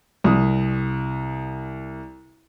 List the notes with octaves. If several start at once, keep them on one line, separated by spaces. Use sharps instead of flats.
C2 D#6